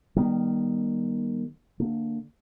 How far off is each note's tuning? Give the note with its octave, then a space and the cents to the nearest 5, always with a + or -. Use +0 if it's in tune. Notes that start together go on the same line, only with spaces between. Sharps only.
D#3 -15 G3 +0 B3 -40
D3 +0 A#3 -25